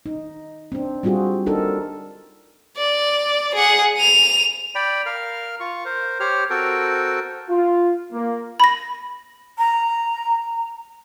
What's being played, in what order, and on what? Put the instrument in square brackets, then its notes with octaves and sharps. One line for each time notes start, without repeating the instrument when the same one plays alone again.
[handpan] D#4
C4 D4
G3 C4 F4 F#4 G#4
D4 D#4 A4 A#4
[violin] D5
G#4 F#5
D#7 F7
[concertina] D5 G5 B5
A#4 F5 F6
F4 C#6
A#4 C5
G4 C5 C#5 F6
C4 F#4 A4 A#4 G5
[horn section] F4
A#3
[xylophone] B5 A#6
[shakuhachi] A#5